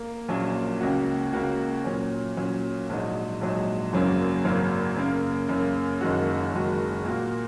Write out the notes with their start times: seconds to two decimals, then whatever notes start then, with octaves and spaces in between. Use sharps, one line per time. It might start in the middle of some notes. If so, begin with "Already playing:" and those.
Already playing: A#3
0.28 A#1 A#2 F#3 A#3 C#4
0.81 C#2 C#3 A#3 F#4
1.33 C#2 C#3 A#3 F#4
1.85 A#2 F#3 C#4
2.37 A#2 F#3 C#4
2.89 A#1 G#2 F#3 D#4
3.41 A#1 G#2 F#3 D#4
3.93 G#1 F#2 C#3 F#3 A#3
4.45 G#1 F#2 C#3 F#3 A#3
4.96 F#2 C#3 A#3
5.49 F#2 C#3 A#3
6.01 F#1 F#2 D#3 G#3 F#4
6.53 F#1 F#2 D#3 G#3 F#4
7.05 A#2 A#3 F#4